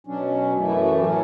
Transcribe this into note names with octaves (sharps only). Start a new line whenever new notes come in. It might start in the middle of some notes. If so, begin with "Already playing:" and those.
B2 F#3 C#4 D4
F#2 E3 A3 D4
E4
F#4
A2 F#3 C#4 G4